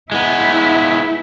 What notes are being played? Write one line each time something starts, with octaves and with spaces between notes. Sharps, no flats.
G#3 B3 E4